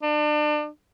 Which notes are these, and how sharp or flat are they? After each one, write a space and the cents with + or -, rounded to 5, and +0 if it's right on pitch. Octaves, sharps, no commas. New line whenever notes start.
D4 +35